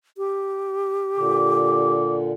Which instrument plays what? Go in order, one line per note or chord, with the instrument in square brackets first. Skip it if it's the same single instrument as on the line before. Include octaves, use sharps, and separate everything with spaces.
[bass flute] G4
[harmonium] A#2 D3 [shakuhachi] D6